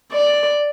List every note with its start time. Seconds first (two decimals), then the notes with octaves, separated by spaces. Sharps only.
0.12 D5